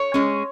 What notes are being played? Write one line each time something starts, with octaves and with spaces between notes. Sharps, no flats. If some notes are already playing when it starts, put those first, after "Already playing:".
Already playing: C#5
G#3 C#4